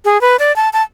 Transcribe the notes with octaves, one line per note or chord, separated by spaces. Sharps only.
G#4
B4
D5
A5
A5